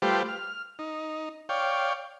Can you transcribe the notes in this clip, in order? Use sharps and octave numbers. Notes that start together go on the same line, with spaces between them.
G3 A3 F4 G4 B4 C5
F6
D#4
C#5 D5 F5 G5